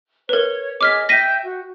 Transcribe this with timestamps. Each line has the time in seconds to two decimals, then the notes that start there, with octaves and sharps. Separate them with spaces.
0.29 A#4 B4 C#5
0.81 G#4 C#5 D#5 D6 F6 B6
1.09 E5 G5 G6 A#6 B6 D#7
1.44 F#4